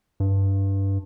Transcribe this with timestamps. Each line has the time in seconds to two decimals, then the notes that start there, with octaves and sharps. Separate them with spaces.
0.20 G2